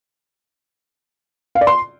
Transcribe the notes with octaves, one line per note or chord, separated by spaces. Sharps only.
F5
D5
C6